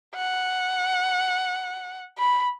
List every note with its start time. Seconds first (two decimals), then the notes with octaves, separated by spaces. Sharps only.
0.15 F#5
2.18 B5